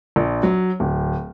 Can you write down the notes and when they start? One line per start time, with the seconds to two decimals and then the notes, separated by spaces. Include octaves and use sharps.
0.16 A#1
0.43 F#3
0.80 D1